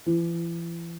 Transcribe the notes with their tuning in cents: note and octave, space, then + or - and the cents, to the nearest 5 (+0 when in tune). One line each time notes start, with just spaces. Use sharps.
E3 +40